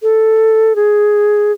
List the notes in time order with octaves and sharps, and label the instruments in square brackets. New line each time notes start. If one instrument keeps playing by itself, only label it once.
[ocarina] A4
G#4